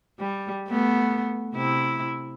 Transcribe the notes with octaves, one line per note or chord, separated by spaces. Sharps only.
G3
A3 B3
C3 E4